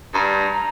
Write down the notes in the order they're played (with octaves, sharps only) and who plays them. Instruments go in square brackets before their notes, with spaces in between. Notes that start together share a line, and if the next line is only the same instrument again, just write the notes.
[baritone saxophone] G2 [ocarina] A#5